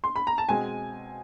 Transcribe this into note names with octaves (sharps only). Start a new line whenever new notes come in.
C6
B5
A#5
A5
B2 G#3 C4 G#5